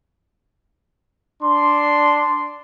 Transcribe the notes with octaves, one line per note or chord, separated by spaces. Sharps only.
D4 C6